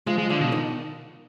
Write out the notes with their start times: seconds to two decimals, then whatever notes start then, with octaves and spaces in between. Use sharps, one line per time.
0.07 F3 G#3 F4
0.18 G#3
0.29 D3 F3 F4
0.41 B2
0.52 D#3 D#4